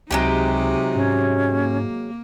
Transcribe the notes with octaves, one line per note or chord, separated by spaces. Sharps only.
C#2 C3 F#3 G#3 D#4 G4
G#2 C#4
A#3